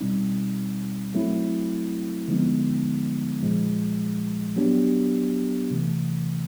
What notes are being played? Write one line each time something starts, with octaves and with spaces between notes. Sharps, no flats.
B2 G3 C4 D#4
F#3 A3 C4 E4
D3 F3 G#3 B3 D#4
A#2 F3 G#3
F#3 B3 D4 G4
C3 E3 A3